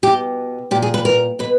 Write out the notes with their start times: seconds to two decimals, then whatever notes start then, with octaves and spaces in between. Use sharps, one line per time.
0.03 B2 G4
0.71 A#2 G4
0.82 G#4
0.94 B4
1.05 A#4
1.39 B2 B4